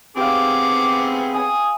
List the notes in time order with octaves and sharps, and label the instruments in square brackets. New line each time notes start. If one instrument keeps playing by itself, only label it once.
[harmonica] B3 C4 G#4 [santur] G4 F5 [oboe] D6
[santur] G#5 [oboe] D#6